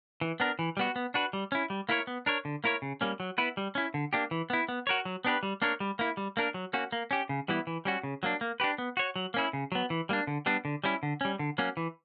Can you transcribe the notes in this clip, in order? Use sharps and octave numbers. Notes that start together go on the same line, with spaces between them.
E3
B3 D4 A#4
E3
G3 B3 F#4
B3
D4 F#4 B4
G3
C#4 E4
G3
A#3 E4 A#4 C#5
B3
D4 A#4 C#5
D3
A#3 E4 A#4 C#5
C#3
G3 A#3 C#4
F#3
B3 E4 B4
G3
C#4 E4
D3
A#3 D4 G4
E3
B3 E4
B3
F#4 A#4 C#5
F#3
B3 D4 G4 B4
G3
A#3 D4 A#4 C#5
G3
A#3 E4
G3
A#3 D4 A#4
F#3
A#3 C#4 F#4
A#3
C#4 G4
C#3
E3 G3 B3 E4
E3
G3 C#4 F#4
C#3
F#3 A#3 D4
A#3
D4 G4 B4
B3
F#4 C#5
F#3
A#3 C#4 E4
C#3
F#3 B3
E3
G3 A#3 D4
D3
G3 B3 D4
D3
G3 C#4 E4
D3
G3 C#4
D3
F#3 A#3 C#4
E3